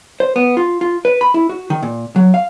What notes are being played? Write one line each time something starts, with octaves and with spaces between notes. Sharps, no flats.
C5
B3
F4
F4
B4
B5
E4
F#4
D#3
A#2
F#3
F5